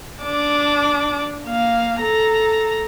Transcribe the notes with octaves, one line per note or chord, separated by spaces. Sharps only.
D4 D6
A#3 F5
A4 A#5